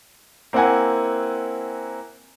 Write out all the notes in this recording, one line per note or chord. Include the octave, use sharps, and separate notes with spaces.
A#3 C4 E4 F#5 G#5